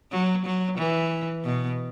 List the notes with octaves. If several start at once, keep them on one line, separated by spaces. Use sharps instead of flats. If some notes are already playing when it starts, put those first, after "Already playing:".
F#3
F#3
E3
B2